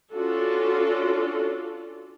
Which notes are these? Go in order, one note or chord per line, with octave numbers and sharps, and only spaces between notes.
C#4 D4 F4 F#4 A4